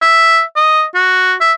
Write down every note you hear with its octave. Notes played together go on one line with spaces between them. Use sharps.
E5
D#5
F#4
E5